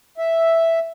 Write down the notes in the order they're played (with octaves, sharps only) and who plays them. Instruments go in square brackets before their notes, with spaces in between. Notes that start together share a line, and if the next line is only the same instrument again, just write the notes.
[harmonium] E5